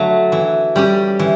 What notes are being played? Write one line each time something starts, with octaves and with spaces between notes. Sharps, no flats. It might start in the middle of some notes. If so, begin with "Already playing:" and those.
Already playing: D3 F#3 A3
E3
G3 C#4 G4
E3